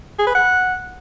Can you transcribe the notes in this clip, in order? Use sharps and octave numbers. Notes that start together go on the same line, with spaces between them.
G#4
B4
F#5